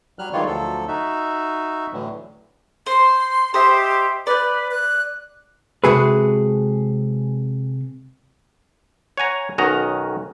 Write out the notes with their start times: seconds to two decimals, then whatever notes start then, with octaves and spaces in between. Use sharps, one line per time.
0.19 F#3 G3 F6 F#6
0.33 D#3 E3 G3 G#3 F4 C#5
0.46 D2 F3 F#3 A4
0.88 D#4 F#4 E5
1.93 A2 D3 E3 F#3
2.86 C5 C6
3.54 G4 C5 D#5 E5
4.27 B4 D5 G6
4.71 F#6
5.84 C3 G#3 F#4 G#4 A4 B4
9.17 C#5 F#5 G#5 A#5
9.58 B1 D#3 C#4 F#4 D#5 A#5